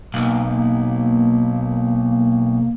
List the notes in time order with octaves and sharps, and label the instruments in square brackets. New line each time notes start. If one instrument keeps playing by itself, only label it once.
[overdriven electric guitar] B1 [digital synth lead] A#3